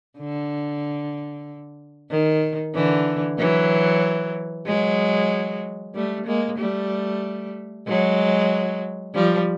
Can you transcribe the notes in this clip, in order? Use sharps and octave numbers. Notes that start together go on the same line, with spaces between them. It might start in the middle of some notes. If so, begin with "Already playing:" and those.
D3
D#3
D3 E3
E3 F#3
F#3 G#3
G3 A3
G#3 A#3
G3 A3
F#3 G#3
F3 G3